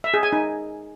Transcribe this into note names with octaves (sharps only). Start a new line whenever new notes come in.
E5
G#4
G#5
D#4